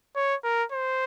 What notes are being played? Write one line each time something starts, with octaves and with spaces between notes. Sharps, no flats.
C#5
A#4
C5